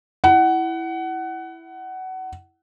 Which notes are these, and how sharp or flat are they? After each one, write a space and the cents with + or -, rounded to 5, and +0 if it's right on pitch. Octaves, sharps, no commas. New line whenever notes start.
E4 +0 F#5 +20